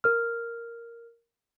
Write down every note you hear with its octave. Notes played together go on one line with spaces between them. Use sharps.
A#4 F6